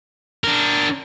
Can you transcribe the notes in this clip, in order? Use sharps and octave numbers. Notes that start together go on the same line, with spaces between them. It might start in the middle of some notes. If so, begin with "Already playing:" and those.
D4 A#4